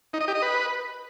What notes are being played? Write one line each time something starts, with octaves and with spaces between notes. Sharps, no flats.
D#4
D#5
G4
D#5
B4